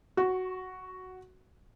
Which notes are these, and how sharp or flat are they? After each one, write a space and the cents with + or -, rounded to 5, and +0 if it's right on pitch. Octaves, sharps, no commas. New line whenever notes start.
F#4 +0 C#6 -25